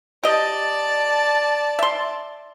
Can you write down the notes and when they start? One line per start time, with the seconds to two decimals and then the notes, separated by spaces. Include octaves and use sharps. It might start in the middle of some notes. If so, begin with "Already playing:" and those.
0.24 G4 D5 D#5 A5
1.79 E5 C6